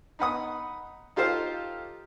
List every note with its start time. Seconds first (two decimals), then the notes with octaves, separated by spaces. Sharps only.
0.19 D#4 B4 F#5 D#6
1.16 D#4 F4 G4 A4 C5 F5